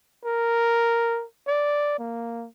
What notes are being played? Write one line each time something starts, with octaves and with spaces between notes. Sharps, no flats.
A#4
D5
A#3